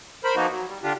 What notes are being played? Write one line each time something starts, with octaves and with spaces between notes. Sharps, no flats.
A#4 C5 B5
F3 A#3 B3 D#4 F#4
F#3
G3
D3 D4 F4 G4